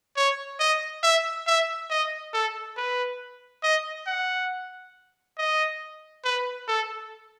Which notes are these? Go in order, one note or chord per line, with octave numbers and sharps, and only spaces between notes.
C#5
D#5
E5
E5
D#5
A4
B4
D#5
F#5
D#5
B4
A4